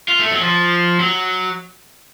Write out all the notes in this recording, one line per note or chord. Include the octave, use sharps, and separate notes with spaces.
F4
A3
F#3
F3
F#3